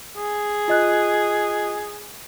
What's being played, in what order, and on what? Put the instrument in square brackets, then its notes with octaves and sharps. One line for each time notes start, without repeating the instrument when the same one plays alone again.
[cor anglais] G#4
[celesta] F4 D#5 F#6